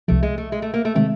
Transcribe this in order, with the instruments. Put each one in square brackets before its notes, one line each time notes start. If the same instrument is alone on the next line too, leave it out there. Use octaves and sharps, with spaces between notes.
[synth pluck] C2 C3 F3 [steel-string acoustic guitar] A3
[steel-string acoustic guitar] G#3
A3
G#3
A3
A#3
A3
[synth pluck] C3 D#3 G#3 C4 [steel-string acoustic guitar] A3